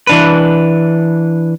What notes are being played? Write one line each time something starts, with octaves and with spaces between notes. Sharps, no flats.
E3 D4 B4